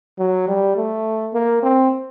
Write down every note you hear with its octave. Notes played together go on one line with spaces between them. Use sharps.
F#3
G3
A3
A#3
C4